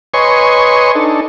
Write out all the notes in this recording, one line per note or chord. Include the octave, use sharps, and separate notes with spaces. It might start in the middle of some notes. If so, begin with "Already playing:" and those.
B4 C#5 D#5 G#5 C6 C#6
D4 D#4 A4